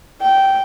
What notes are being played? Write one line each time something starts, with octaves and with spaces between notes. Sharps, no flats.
G5